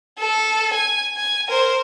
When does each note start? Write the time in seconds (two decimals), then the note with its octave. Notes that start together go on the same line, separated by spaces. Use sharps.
0.19 A4
0.74 G#5
1.17 G#5
1.48 A#4 C5